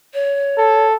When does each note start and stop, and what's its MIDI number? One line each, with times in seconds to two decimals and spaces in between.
0.14 0.87 73
0.58 0.95 69